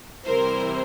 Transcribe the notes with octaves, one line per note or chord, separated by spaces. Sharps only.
C3 E3 G3 C4 E4 A#4 C5